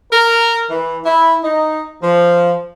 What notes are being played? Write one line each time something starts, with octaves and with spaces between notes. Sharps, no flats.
A#4
E3
E4
D#4
F3